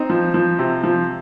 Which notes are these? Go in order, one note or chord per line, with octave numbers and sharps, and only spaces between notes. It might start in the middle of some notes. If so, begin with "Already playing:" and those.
Already playing: C4 D#4
F3
F3
C3
F3